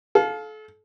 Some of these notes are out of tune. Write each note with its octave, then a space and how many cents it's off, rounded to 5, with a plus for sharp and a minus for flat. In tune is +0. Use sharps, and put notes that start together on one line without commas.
A4 -35 F5 +15